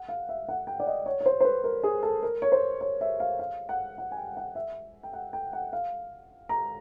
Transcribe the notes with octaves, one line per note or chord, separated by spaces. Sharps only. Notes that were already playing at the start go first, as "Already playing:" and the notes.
Already playing: F#5
F5
E5
F#5
G5
D5
D#5
C#5
C#5
C5
C5
B4
A#4
G#4
A4
A#4
C#5
C5
C#5
E5
F5
F5
F#5
F#5
G#5
G5
F#5
E5
G5
F#5
G5
F#5
F5
A#5